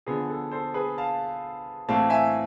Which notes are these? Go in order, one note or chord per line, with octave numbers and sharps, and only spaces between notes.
D3 F3 B3 G#4
A4
A4 C5
G#4 B4
F5 A5
A2 E3 A3 C4 F5 A5
E5 G#5